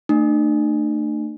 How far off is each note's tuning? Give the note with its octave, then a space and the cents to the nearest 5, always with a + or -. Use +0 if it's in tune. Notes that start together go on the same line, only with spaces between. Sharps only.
A3 +30 D4 +40